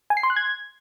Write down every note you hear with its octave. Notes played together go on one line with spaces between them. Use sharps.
G#5
C7
C6
F#6
G#6